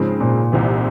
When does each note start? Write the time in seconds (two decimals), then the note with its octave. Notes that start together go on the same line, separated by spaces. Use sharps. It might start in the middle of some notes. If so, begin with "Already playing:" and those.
Already playing: G#2 C#3 F3 G#3 C4
0.20 A#2
0.52 C2 C3 E3